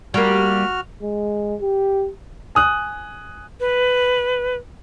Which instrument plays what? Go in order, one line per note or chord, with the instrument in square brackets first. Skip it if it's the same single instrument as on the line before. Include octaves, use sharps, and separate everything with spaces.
[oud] G3 A#3 [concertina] F#4 F6
[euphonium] G#3
G4
[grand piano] G#5 D#6 F#6
[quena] B4